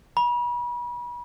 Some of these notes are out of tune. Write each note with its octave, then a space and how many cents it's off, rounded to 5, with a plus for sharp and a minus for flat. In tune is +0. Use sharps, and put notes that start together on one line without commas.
B5 -40